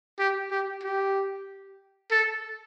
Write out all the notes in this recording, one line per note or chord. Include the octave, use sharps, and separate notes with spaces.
G4
G4
G4
A4